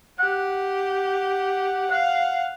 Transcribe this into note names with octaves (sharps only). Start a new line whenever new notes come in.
G4 F#5
F5 F#5